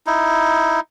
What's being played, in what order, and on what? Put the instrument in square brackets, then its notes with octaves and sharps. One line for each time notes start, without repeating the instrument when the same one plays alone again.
[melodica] D#4 E4